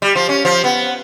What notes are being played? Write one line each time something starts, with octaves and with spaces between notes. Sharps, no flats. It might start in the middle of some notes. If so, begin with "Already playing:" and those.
G3
F3
C#4
F3
B3